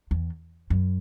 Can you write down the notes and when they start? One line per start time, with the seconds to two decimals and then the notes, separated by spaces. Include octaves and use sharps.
0.11 E2
0.70 F#2